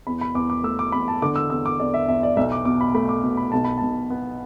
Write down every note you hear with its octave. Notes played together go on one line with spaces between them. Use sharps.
E2 B5
B5
E2 D6
D6
A3 E6
D6
E2 B5
A5
D3 D6
E6
E2 E6
D6
E2 D5
E5
E2 E5
D5
B1 E5
D6
B2 D6
B5
A3 B5
D6
B2
B5
B1 A5
B5
B1 A5
B3